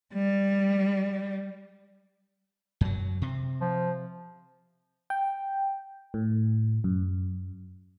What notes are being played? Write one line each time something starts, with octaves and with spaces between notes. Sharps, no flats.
G3
F#2 F#3
C3 C4
F3
G5
A2
F#2